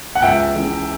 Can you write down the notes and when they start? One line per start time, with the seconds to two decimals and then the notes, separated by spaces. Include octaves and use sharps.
0.15 F#5
0.22 C#2 E5 G5
0.55 C#3 E3